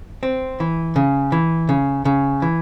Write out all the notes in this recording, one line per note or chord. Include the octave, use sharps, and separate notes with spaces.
C4
E3
C#3
E3
C#3
C#3
E3